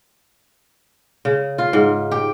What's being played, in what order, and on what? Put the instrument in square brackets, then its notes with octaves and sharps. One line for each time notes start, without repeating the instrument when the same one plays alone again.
[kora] C#3
F4
G#2
G4